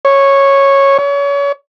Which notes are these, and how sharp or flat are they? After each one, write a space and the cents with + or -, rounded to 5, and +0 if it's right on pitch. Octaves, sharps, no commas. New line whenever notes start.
C#5 -10
C#5 +30